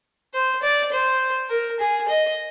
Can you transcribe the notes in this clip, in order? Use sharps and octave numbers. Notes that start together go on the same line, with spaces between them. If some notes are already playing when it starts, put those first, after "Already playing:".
C5
D5
C5
A#4
G#4
D#5